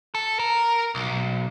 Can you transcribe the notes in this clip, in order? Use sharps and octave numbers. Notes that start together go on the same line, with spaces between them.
A4
A#4
B1